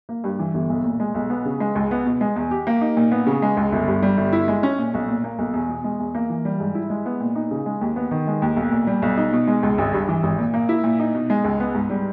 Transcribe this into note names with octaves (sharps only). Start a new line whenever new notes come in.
A#3
G2
E3
G1
B1
A#2
G#3
B1
B3
C#3
G#3
C#2
B3
B2
G#3
E2
G4
A#3
D#4
A#2
B3
C#3
G#3
C#2
G1
G2
G3
G1
E4
G#3
C#4
A#2
B1
A#2
A#3
B1
E2
B2
G#3
E2
A#3
E3
G3
G#2
E4
G#3
B3
A#2
D#4
C#3
G#3
D#2
B3
D#3
G#3
D#2
B1
A#2
G3
B1
D#4
B2
G#3
C#2
G#1
G2
E3
G#1
A#2
A#3
E4
A#2
D#4
B2
G#3
C#2
B3
G#2
G3